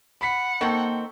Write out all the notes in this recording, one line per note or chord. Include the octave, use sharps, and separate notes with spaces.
F#5 B5 B6
D#3 A#3 C4 A4 C#6